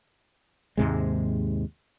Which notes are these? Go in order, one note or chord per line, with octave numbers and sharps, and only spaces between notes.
D#2 G#2 C3 G#3